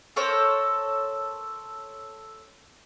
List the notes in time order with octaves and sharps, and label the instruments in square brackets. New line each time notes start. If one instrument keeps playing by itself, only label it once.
[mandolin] A4 A#4 C5 C#5